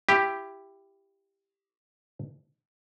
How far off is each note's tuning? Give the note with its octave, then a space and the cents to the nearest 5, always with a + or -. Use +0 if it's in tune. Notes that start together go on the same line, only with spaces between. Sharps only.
E4 +15 G4 +5